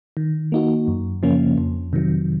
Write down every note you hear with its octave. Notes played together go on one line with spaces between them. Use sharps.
D#3
A#3 D#4 F#4
F#2
C#3 F3 A#3 C#4
F2
C3 D#3 F#3